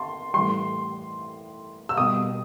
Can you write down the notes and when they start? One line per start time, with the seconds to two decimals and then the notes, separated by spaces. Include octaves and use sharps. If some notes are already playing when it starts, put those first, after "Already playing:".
Already playing: A5 C6
0.34 A2 E3 G3 C6
1.89 E6
1.97 B2 G3 D#6